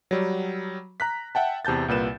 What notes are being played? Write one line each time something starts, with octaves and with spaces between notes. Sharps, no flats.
F#3 G3
A#5 F#6 B6
E5 F#5 G5 A5
E2 C3 A5 G6 A6
C2 A#2 B4 E7